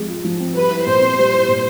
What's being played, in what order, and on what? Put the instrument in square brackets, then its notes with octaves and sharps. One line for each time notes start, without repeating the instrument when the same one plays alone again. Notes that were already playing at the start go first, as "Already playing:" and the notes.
Already playing: [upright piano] F3 G#3 C4
F4
F3
C4
[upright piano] G3 [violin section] B4
[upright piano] E4
[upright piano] A#2 [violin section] C5
[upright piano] C4
G3
E4
A#2